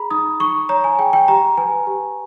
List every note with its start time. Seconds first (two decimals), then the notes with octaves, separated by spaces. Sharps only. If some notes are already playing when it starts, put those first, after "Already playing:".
Already playing: G#4 A#5 B5
0.11 D#4 D#6
0.40 D#4 C#6
0.69 C#5 A#5
0.84 G#5
0.99 G#4 G5
1.13 G5
1.28 G4 A#5
1.58 B4 G#5
1.87 G4